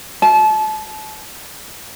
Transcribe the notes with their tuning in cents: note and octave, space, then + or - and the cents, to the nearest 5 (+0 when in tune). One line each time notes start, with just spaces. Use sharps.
A5 -30